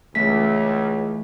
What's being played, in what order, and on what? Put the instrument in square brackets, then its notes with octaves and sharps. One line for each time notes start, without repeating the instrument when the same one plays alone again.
[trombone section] C#2 [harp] E3 A3 [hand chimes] B6